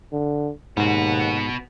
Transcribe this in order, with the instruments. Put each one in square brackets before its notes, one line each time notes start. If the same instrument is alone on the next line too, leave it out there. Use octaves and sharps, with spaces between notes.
[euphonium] D3
[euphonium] D#2 [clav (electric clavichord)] G#2 [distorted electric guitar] B3 F#4